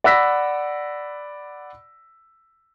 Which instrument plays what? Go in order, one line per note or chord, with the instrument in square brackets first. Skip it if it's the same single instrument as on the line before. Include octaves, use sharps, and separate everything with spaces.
[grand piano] D5 F#5 B5 E6 A#6 B6